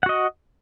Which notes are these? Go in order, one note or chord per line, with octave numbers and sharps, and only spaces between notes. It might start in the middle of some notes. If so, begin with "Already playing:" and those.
F#4 D#5 F#5